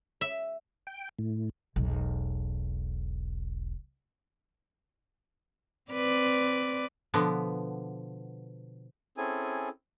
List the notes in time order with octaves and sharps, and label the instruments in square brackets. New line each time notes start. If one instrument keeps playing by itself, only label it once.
[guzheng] E5
[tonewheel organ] G5
A2
[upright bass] E1 B1
[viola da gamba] C4 B4 D5
[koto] B2 D3 F3 B3
[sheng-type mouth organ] C4 C#4 E4 G#4 A4 G#5